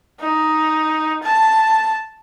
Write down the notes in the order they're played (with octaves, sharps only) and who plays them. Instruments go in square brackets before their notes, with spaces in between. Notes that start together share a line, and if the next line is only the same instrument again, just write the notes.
[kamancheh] D#4
A5